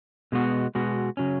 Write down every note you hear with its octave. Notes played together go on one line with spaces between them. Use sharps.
B2 G#3 B3 F#4
B2 G#3 B3 F#4
C#3 F#3 C#4